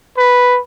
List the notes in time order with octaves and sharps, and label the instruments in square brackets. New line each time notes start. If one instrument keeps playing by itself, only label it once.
[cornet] B4